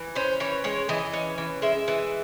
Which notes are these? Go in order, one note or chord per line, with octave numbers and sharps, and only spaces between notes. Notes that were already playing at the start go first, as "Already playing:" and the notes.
Already playing: E3
C#4 C5
E3 C#5
G#3 C#5
E3 D#5
C#4
E3
G#3 E5
E3